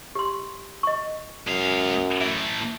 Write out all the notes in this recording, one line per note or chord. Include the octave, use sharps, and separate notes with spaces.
G4 C6
D#5 C#6
F#2 G#3 F5
E3 A3 E5